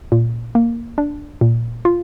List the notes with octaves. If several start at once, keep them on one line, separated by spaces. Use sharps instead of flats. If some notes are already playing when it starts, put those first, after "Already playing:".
A#2
A#3
D4
A#2
F4